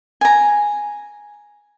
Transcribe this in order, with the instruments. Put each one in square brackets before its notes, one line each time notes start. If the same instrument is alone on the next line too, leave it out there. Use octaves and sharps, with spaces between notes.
[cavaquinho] G#5 A#5